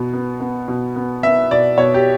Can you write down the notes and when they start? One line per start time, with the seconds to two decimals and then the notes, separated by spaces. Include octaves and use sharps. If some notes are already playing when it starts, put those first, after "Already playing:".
Already playing: B2 B3
0.13 B3
0.40 B3
0.68 B2
0.96 B3
1.23 B3 E5
1.51 B2 D5
1.77 B2 C#5
1.94 G4